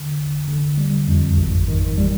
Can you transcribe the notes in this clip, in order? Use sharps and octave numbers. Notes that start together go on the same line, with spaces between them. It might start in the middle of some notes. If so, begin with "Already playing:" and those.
Already playing: D3
G1
D3
G3
F2
G#1
D#3
G3